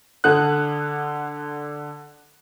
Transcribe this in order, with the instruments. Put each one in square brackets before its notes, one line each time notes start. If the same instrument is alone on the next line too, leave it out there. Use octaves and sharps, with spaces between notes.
[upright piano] D3 A4 F#5 D#6 F#6